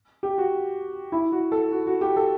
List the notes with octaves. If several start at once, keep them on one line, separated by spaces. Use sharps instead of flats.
G4
F#4
E4
F#4
A4
F#4
F#4
G4
A4